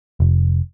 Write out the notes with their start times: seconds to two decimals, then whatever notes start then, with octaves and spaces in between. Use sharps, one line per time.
0.20 F1